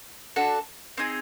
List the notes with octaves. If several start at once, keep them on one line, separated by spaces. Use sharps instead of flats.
D4 F#4 A4
C4 D#4 G#4